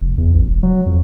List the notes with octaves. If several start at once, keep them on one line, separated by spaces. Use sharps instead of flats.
F1
E2
A1
E1
F#3
F2